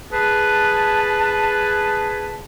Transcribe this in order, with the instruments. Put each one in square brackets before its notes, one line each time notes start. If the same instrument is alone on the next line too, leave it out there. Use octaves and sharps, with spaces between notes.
[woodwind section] G#4 B4 A5